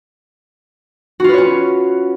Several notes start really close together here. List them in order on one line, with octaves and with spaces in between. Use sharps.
F#4 F4 B4 C#5 C#4